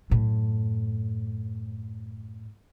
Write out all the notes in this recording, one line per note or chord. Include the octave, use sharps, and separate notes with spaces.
F#2 A2